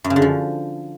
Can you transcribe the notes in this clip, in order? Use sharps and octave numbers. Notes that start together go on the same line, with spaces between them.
F#2
C#3
D3
F3